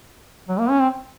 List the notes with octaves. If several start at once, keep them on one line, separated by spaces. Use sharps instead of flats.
F#3
A#3
C#4
C4